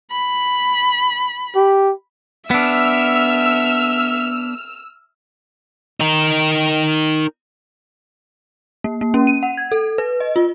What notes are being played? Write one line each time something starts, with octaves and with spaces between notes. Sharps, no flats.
B5
G4
B3 D4 E5 E6 F6
D#4 A#4
A#3
A#3
C#4
D#7
F#5
G#6
A4
B4
D#5
F4